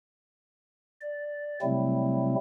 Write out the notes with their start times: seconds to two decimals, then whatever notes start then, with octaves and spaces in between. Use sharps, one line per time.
1.02 D5
1.62 C3 F#3 G3 A3 C4 E4